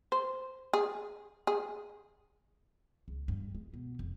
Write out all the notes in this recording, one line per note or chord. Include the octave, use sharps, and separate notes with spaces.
C5
G#4
G#4
C#2
G2
G#3
B2
F1